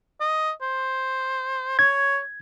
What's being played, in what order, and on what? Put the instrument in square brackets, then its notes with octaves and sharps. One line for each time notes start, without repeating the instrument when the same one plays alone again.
[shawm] D#5
C5
[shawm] C#5 [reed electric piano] G#6